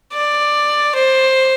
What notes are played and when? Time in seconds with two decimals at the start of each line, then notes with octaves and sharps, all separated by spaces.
0.13 D5
0.95 C5